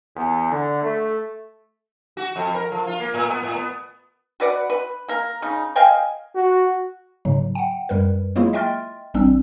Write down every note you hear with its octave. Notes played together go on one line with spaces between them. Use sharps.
E2
D3
A3
F#4
F2
A#4
F3
F4
A#3
A2
B3
A2
B3
F#4 B4 D5 F#5
B4
A#3 A#4
C#3 D#4
D#5 F5 G5 G#5
F#4
G#2 C#3 F#3
F#5 G5
F#2 G3 A#4 B4
F#3 G#3 A#3 E4 F4 G#4
D#5 E5 G5 C6 F6 A6
A1 G3 C4 D4 E6